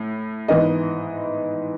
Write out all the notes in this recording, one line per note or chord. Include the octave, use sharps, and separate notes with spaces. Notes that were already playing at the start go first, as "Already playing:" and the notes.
Already playing: A2
G#2 E3 B3 D#5